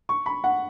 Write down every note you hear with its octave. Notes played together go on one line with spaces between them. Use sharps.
C#6
B5
F#5